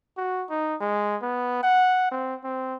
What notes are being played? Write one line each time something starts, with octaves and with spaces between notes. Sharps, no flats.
F#4
D#4
G#3
B3
F#5
C4
C4